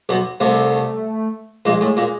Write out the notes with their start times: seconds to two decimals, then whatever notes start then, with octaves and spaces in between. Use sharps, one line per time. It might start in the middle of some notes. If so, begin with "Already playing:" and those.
0.09 B1 B2
0.40 C2 C3 A3
1.65 A#1 A#2 G#3
1.81 A2
1.97 A#2